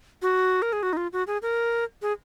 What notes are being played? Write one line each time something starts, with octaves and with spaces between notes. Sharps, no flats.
F#4
A#4
G#4
F#4
D#4
F4
F#4
G#4
A#4
G#4